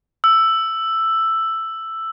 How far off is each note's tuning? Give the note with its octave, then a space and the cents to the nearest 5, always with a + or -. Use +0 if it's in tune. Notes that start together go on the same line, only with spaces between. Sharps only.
E6 +5